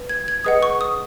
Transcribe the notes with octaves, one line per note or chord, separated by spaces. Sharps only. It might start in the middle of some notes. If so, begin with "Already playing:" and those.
Already playing: B4
G#6
G#6
G#4 B4 D#5 F#5 D#6
C#6
D#6